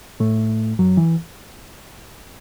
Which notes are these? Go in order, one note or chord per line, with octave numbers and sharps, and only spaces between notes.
A2 A3
F#2 F#3
E3